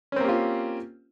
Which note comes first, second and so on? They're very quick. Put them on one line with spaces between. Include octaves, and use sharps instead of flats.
C#4 C4 A#3 G4 F4